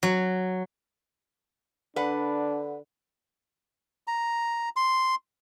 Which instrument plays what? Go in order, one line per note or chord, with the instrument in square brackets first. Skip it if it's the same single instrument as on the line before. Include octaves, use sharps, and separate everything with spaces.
[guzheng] F#3
[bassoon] D3 [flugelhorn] D4 [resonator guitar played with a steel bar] B4 F#5
[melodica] A#5
C6